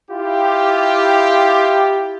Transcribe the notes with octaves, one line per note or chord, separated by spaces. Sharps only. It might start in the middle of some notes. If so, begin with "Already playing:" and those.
E4 F4 G4